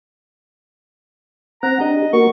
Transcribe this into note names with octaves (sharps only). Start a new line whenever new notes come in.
C4 F#5 A#5
D4 G4 D#5
A#3 F#4 A#4 C#6